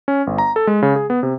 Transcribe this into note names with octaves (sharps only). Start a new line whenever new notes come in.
C#4
G1
A#5
A4
G#3
C#3
G#4
B3
C3